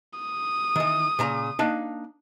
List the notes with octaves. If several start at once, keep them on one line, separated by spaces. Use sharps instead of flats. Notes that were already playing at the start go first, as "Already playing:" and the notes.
D#6
D#3 E3
A#2 C#3 A#5
A#3 D4 D#4